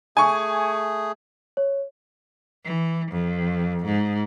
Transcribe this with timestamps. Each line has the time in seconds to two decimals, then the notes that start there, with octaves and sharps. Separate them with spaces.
0.17 A3 G#4 G#5 C#6
1.57 C#5
2.65 E3
3.11 F2
3.85 G#2